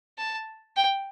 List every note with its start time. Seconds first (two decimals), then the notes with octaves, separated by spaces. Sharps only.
0.18 A5
0.77 G5